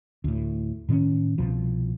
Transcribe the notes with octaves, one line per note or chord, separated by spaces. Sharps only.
D2 A2
A2 D#3 C4 C#4
C2 B2 F3